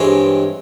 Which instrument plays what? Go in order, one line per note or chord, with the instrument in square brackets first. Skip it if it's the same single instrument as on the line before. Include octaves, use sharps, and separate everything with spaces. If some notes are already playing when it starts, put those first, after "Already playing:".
Already playing: [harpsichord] G2 E3 G#3 C4 C#5